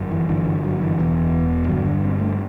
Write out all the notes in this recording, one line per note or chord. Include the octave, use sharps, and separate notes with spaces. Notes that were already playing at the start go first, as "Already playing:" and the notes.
Already playing: G1 F#2
E3
G1 F#2 D3 E3
F#3
E3
E1 E2 B2
G1 G2 D3 F#3
D4
C4
A3